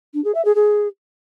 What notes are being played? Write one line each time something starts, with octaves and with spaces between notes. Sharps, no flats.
D4
G#4
E5
G#4
G#4